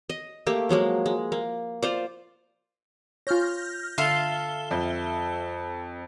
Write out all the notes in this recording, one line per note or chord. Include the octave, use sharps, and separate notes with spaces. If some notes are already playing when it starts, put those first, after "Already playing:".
D#5
A3 A#3 G4
F3 F#3 G#3 A#3
G#3
A#3
F4 C5 D5
F4 C#5 F6 G6 A#6
D3 F4 A4 E5 G7
F2